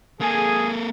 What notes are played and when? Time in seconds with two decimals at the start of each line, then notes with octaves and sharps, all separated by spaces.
0.21 A#3 G#4 A4